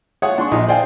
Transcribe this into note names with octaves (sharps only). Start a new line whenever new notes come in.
F4 G#4 C#5 E5 F#5 D#6
D4 C6 C#6
A#1 D#4 G#4
G#4 C5 D5 F5 G5 G#5